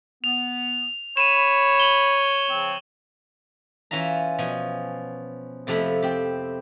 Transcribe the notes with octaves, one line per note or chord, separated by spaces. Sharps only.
B3 F7
C#5 B5 D#7 E7
E7 F#7 G7
C#3 F3 C4
E3 C#4 F4 E5 A#5
B2 F3 G#5
F2 C3 F3 A3 E4 B5
C4 G4